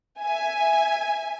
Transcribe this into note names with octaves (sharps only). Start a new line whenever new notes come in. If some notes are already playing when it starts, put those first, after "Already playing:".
E5 G#5